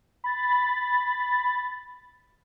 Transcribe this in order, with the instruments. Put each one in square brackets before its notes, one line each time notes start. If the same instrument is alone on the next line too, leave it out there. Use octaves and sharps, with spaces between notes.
[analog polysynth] B5 A6